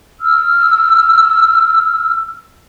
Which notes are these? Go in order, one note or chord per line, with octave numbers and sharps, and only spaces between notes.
E6 F6